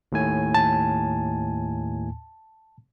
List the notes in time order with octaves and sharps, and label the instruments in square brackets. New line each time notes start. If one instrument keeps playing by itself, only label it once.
[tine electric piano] D#2 A2 G#5
[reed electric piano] A5